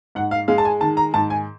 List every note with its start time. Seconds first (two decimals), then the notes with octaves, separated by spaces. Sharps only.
0.15 G#2 F#5
0.31 F5
0.48 G#3 F5
0.58 A5
0.65 G#5
0.81 D#3 A5
0.97 A#5
1.14 G#2 A5
1.30 G#5